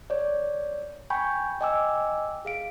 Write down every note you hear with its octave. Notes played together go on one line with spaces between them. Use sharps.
C#5 D5
G5 G#5 B5 C#6 G6
D#5 G5 G#5 D6 E6
G#4 F5 D7